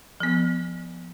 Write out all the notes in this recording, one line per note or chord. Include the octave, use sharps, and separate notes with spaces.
F3 B3